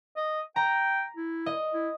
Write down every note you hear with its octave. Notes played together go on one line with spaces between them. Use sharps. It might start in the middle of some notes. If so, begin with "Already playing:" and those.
D#5
G5 A#5
E4
D#5
E4